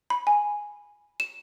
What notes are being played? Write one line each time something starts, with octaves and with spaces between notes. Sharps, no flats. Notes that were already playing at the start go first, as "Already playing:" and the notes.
B5
G#5
E7